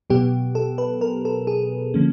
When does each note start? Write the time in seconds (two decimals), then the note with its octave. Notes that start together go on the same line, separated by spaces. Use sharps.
0.10 B2 F#3 B3 G4
0.55 A4
0.78 B4
1.01 A#4
1.25 A4
1.47 G#4
1.94 D3 F3 A#3 C#4